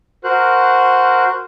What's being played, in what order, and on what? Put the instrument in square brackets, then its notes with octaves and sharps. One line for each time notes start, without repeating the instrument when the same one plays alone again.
[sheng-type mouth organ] F#4 A#4 C5 F#6